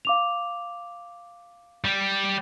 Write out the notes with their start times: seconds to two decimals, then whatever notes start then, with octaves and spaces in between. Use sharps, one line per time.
0.05 F5 D6 F7
1.85 G3